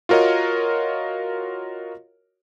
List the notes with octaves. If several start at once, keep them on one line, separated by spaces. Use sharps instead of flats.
F4 F#4 A#4 C#5 D#5